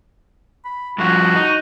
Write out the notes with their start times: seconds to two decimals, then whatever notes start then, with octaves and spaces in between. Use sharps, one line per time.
0.65 B5
0.98 G2 F3 F#4
1.36 D#4